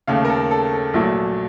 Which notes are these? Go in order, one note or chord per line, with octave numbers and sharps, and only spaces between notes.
D#2 C#3 A3 F5
A#4
A4
A4
A4
A#1 A#2 F#3 A3